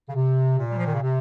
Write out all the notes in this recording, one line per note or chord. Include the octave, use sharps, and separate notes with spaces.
C#3
C3
A#2
G3
F3
D#3
C#3
C3